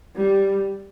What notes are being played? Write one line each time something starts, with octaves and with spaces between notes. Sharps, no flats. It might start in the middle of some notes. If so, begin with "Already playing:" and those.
G3